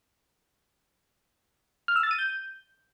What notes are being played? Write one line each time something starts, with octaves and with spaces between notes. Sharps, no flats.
F6
E6
A6
D#7
G6